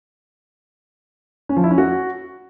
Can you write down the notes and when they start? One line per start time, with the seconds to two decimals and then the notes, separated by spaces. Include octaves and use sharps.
1.49 C#4
1.57 F3
1.64 E4
1.71 C#4
1.78 F#4